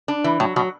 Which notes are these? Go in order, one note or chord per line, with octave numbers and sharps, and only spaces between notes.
D4
E3
A2 F#3
B2 F#3